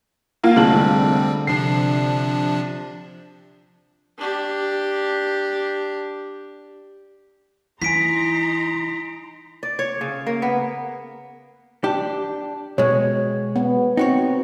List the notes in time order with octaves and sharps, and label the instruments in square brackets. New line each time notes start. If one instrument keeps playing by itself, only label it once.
[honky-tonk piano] A#3 F4
[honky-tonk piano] F1 G#3 F#7 [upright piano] D3 [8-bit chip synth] G3 C4
[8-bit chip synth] C3 F3 D4 [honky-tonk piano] C7
[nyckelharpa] D4 G4
[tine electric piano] E3 G#5 [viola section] D#4 A#5 C6 [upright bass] E4 [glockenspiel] B6 D7
[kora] D5
C#5
C#3
A#3
B3
[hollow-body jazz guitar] D4 G4
[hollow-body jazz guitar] B2 G#3 [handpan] C#5
[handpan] B3
[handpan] C4 [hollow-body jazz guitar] D#4 F#4 C#5